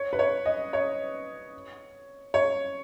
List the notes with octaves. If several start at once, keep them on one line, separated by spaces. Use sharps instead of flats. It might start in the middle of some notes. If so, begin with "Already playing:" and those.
Already playing: C#5
B4
C#5
D#5
C#5
C#5